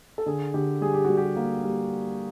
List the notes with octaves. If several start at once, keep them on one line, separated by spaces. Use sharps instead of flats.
A4
D3 G#4
D3 G4
G3 G#4
G4
G3 F#4
G4
A#3
G3